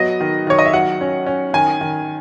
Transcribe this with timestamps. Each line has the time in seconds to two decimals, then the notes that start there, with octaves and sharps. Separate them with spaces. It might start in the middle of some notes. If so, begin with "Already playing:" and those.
Already playing: F#3 B3 D#5
0.20 D#3
0.47 D#3 C#5
0.59 D#5
0.66 E5
0.73 F#3 F#5
1.01 C#4
1.26 C#4
1.54 D#3 G#5
1.81 D#3